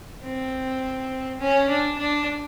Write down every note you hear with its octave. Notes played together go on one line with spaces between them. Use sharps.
C4
C#4
D4
D4